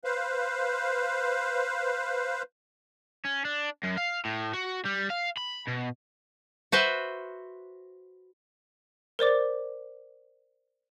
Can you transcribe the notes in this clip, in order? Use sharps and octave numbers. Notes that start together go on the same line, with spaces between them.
B4 C5 F5
C#4
D4
F#2
F5
A2
F#4
G3
F5
B5
B2
F#4 B4 C5 E5
A#4 C5 D5 D6